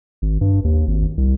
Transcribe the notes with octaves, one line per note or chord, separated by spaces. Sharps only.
G#1
G2
D#2
G#1
C2